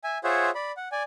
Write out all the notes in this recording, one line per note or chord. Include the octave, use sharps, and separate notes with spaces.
E5 G#5
F4 G#4 C5 C#5 E5 F#5
D5 B5
F#5
D5 G#5